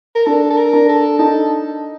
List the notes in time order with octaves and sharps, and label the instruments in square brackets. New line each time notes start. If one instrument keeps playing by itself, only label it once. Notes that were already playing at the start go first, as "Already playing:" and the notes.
[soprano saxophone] A#4
[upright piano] D4 [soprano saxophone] A4
[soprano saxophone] A4
A#4
[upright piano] D4
[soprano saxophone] A4
[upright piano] D#4 [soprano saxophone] A4